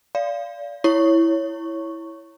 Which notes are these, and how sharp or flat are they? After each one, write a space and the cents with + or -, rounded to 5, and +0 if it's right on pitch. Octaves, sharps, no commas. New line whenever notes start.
D5 -25 F5 -15
E4 +0 C#5 +0 C#6 +0